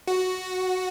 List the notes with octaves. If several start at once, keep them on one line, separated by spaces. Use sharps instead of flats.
F#4